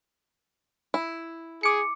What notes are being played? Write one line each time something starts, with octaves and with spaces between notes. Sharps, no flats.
E4
G#4 D6 C#7